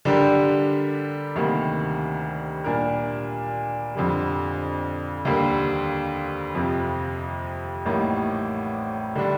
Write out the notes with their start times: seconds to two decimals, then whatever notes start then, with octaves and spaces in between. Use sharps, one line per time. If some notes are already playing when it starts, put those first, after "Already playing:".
0.05 D3 G3 D4 G4 A#4
1.35 D2 C3 D#3 G3 A#3
2.64 A#2 G3 D4 G4 A#4
3.95 F2 D3 G3
5.25 D#2 D3 G3 A#3
6.55 F2 C3 F3
7.85 A1 A2 G3 A#3 D#4
9.15 D3 G3 D4